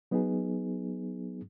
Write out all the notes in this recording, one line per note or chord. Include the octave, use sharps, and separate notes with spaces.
F#3 B3 D#4 G#4